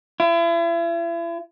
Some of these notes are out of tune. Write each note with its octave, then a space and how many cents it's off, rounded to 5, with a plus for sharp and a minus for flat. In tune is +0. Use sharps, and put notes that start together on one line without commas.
E4 +40